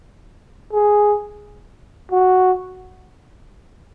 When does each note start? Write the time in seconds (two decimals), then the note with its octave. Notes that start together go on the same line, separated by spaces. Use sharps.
0.73 G#4
2.11 F#4